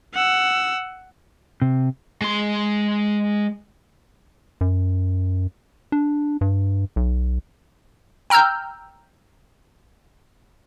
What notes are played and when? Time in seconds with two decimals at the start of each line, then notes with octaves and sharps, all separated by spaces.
0.14 F#5 E6
1.62 C3
2.21 G#3 C6
4.61 F#2
5.92 D4
6.41 G2
6.96 B1
8.30 G5 A#5 E6 F6 G6